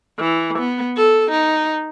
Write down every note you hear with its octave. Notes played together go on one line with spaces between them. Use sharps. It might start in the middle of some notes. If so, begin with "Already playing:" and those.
E3
B3
A4
D#4